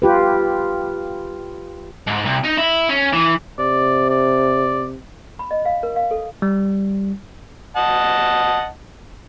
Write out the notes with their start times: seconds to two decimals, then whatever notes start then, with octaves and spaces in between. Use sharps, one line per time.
0.02 F4 G4 B4
2.08 G#2
2.26 C2
2.45 D#4
2.58 E4
2.89 C#4
3.13 E3
3.59 C3 D5
4.10 D5
5.39 B5
5.51 D#5
5.65 F5
5.83 A#4
5.96 F5
6.11 A4
6.42 G3
7.76 D#5 F#5 A5